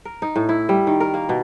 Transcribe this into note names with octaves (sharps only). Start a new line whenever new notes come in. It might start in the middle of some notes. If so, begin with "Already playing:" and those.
A#4
D#4
A2
E4
G3
D#3
A#4
A#3
B2